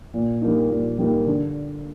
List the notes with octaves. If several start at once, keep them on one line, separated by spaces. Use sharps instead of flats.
A#2
G3 A#3 D#4
A#2
G3 A#3 D#4
D3